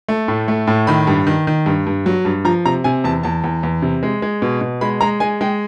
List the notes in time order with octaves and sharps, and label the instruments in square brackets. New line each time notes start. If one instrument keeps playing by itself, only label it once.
[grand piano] A3
A2
A3
A2
D#3 B5
G2
D#3
D#3
G2
G2
F#3
G2
F3 A#5
C3 A#5
C3 G#5
E2 A5
E2 A5
E2
E2
C3
G#3
G#3
B2
B2
G#3 B5
G#3 A#5
G#3 G#5
G#3 G5